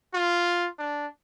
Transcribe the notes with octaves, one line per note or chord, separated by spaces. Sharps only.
F4
D4